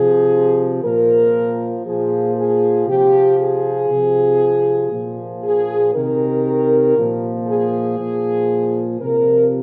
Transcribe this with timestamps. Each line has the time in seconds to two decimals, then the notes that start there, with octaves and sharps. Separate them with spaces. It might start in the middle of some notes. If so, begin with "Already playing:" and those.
Already playing: C3 F3 G#4
0.82 A#2 F3 A#4
1.85 A#2 F3 G#4
2.36 G#4
2.87 C3 F3 G4
3.38 G#4
3.90 C3 F3
4.92 A#2 F3
5.43 G#4
5.94 C3 D#3 A#4
6.96 A#2 F3
7.47 G#4
7.98 A#2 F3
9.01 C3 F3 A#4